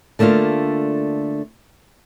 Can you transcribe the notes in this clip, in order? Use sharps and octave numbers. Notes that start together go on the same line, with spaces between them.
D3 A3 A#3 D4 F4